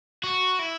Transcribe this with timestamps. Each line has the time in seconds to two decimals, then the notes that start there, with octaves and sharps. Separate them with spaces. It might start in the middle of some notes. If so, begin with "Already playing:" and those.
0.23 F#4
0.59 E4